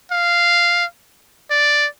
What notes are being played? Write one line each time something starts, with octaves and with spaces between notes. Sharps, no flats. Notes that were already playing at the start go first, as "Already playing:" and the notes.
F5
D5